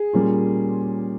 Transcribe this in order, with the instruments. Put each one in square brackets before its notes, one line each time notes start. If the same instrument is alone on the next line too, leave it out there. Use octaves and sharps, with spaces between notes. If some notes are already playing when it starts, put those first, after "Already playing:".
Already playing: [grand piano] G#4
A#2 G3 A#3 C#4 F4